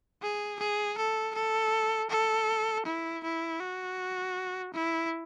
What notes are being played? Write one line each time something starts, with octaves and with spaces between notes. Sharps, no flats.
G#4
G#4
A4
A4
A4
E4
E4
F#4
E4